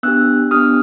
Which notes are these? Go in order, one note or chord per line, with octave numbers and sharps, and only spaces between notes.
B3 D4 G4 E6 F#6
B3 D4 G4 D#6 F6